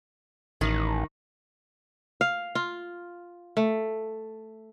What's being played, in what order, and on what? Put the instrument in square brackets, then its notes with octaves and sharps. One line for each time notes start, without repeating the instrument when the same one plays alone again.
[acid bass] A1 [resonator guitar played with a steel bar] D#3
[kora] F5
F4
A3